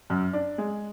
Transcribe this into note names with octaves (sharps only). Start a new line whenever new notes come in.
F#2
D4
G#3